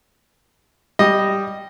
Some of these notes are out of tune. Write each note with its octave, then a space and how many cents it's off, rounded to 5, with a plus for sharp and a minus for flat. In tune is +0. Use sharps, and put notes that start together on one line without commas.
G3 +0 D#5 -5